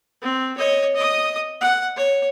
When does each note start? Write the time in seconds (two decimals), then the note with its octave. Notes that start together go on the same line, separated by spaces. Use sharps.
0.22 C4
0.58 C#5 D#5
0.95 D#5 D#6
1.61 F#5
1.96 C#5